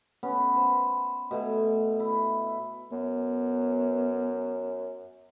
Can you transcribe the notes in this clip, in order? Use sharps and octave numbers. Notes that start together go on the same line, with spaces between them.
B3 C#4
C5
B2 A3 G#5
E4
F#2 B3